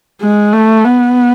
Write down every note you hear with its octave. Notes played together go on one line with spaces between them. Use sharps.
G#3
A3
B3